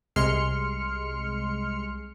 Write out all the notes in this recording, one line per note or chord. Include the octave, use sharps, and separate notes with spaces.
C2 G#3 C6 F6 C#7